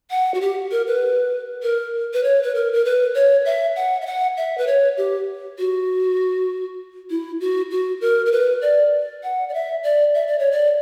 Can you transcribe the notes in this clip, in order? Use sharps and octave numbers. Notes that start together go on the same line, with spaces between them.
F#5
F#4
G4
A#4
B4
A#4
B4
C#5
B4
A#4
A#4
B4
C#5
E5
F#5
E5
F#5
E5
B4
C#5
G4
F#4
E4
F#4
F#4
A#4
A#4
B4
D5
F#5
D5
E5
D5
E5
D5
C#5
D5